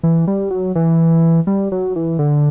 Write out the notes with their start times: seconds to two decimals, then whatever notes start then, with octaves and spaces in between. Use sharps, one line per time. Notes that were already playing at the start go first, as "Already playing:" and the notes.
0.03 E3
0.27 G3
0.50 F#3
0.75 E3
1.47 G3
1.72 F#3
1.96 E3
2.19 D3